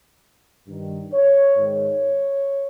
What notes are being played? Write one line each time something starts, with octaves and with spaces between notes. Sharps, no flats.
G2 D#3
C#5
G#2 D#3 C#5